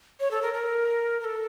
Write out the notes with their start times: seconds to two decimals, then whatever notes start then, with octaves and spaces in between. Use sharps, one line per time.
0.20 C#5
0.31 A4
0.42 A#4
0.54 A#4
1.20 A#4
1.24 A4